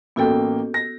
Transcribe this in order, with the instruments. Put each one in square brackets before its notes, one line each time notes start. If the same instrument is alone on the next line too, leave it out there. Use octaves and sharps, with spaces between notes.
[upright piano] A1 A#3 G5 [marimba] B3 F#4 A4
[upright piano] A#6